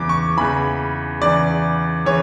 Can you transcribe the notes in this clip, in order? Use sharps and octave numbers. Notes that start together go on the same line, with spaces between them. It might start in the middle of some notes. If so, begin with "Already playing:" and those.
Already playing: E2 C#3 E3 D6
C#6
E2 C#3 E3 B5
E2 C#3 E3 D5
C#3 E3 C#5